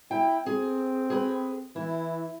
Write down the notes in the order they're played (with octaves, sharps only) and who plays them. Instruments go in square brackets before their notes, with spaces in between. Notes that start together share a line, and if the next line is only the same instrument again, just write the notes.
[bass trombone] E4 [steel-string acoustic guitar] G5
[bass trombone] C4 [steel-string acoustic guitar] G#4
[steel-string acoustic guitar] G#4 B4
[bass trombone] E3 [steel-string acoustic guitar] E4